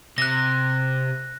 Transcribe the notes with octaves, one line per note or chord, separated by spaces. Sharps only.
C3 F#6 A#6